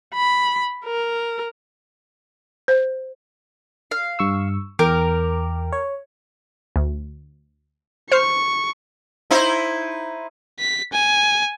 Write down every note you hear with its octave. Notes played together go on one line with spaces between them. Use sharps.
B5
A#4
C5
F5
G2 C#6 E6
E2 A#4 G5 D6
C#5
D2
C5 C#6 F6 C7
D#4 E4 C5
B6
G#5